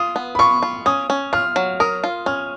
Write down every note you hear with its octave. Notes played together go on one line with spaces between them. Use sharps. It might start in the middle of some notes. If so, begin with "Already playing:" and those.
Already playing: F4 D#6
B3
B5
F4 C#6
F4
C#4 D#6
C#4
F4 F6
F#3
A#4 D#6
F4
C#4 F6